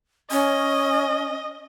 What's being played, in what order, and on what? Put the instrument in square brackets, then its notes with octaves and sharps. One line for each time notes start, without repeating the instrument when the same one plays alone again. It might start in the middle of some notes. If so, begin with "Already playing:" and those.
[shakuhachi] C#4 [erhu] D#5